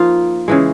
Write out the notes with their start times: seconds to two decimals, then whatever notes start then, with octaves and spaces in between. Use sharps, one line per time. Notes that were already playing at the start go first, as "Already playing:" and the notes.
Already playing: F3 A#3 D#4 F4
0.48 C#3 E3 G#3